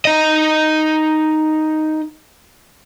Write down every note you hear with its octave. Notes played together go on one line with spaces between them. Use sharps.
D#4 D#5